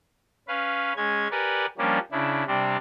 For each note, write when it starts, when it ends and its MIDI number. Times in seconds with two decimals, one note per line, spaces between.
0.48 0.93 61
0.48 0.93 71
0.48 0.93 77
0.97 1.28 56
0.97 1.28 61
0.97 1.28 92
1.31 1.66 67
1.31 1.66 70
1.31 1.66 71
1.31 1.66 74
1.31 1.66 78
1.31 1.66 80
1.78 1.98 53
1.78 1.98 55
1.78 1.98 58
1.78 1.98 61
1.78 1.98 62
2.11 2.44 49
2.11 2.44 62
2.11 2.44 64
2.47 2.77 48
2.47 2.77 55
2.47 2.77 60
2.47 2.77 62